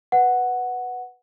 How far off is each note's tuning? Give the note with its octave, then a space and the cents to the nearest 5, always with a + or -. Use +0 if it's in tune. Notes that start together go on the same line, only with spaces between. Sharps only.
B4 +0 F#5 +0